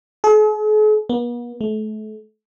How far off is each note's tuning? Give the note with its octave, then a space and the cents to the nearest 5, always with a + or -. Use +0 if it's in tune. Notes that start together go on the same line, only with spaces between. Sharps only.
G#4 +45
B3 -45
A3 -35